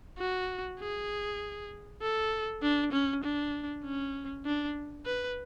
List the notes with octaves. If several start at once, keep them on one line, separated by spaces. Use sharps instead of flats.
F#4
G#4
A4
D4
C#4
D4
C#4
D4
B4